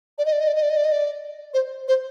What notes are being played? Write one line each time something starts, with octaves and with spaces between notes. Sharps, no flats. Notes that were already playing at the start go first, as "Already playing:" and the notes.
D5
D#5
D5
D#5
D5
D#5
D5
D#5
D5
D#5
D5
C5
C5